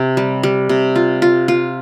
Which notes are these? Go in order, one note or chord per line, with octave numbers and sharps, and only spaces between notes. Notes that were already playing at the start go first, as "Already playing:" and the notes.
Already playing: C3
G3
G3
C3
F4
F4
F4